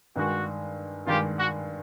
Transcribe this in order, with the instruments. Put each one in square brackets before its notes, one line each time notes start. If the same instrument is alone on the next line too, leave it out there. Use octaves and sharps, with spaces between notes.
[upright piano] G2 D#3 G#3 [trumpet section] F#4
[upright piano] G2 D#3 G#3 [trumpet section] F4 G4
[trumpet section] F#4